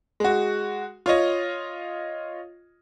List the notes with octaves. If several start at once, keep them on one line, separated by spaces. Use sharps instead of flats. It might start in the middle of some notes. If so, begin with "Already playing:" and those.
G#3 F#4
F4 C#5 D#5